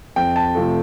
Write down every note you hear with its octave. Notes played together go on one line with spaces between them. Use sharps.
F2 G5
A5
C3 F3 A3